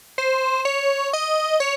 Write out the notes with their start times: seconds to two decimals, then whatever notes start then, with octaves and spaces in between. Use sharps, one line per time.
0.18 C5
0.65 C#5
1.13 D#5
1.60 C#5